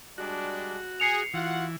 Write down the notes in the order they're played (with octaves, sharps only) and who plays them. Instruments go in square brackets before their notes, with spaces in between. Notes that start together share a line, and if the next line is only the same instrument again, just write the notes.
[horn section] G3 G#3 D4 [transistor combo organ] F#4
[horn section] G#4 [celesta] C7 C#7 F7
[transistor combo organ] E3 [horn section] F4 F#4 F#5